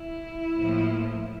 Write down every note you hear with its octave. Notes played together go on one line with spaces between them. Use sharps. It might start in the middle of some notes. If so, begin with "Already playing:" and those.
Already playing: E4
A2 F3 A#3